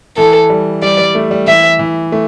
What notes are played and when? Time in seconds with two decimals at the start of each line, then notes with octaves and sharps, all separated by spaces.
0.17 E3 A4
0.50 G3
0.82 G3 D5
0.99 G3
1.15 A3
1.31 G3
1.47 E3 E5
1.79 E3
2.12 A3